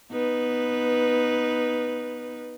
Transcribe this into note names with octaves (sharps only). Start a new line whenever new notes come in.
B3 D#4 B4